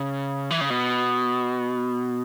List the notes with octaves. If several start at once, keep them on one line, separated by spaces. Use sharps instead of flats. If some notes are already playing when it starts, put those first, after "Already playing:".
Already playing: C#3
E3
C#3
B2